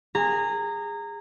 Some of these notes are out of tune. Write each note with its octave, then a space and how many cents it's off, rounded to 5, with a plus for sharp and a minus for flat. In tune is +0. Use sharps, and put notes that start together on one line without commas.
G#4 -20 A#5 -20